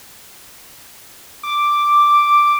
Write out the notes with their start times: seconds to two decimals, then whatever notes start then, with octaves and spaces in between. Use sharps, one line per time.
1.43 D6